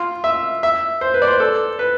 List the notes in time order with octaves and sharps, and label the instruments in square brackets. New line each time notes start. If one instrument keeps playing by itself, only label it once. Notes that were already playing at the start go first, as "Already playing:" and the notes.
Already playing: [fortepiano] F4
E5
E5
C5
B4
D5
C5
A4
B4